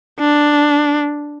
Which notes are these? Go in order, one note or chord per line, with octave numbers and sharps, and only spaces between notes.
D4